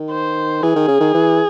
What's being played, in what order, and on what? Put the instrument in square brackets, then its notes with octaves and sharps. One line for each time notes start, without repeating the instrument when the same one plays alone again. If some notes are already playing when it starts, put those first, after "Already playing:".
Already playing: [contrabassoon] D#3
[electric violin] C5
[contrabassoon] E3 [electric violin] G#4
[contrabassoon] D#3
C#3
D#3
E3